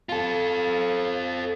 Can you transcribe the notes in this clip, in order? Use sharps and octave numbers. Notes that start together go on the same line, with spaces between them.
F4 A4